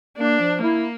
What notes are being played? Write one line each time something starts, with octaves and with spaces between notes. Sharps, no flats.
A#3 D4
F3
A#3 E4